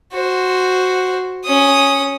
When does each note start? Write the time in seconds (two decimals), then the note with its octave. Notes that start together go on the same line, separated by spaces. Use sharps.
0.13 F#4 C5
1.45 C#4 D#6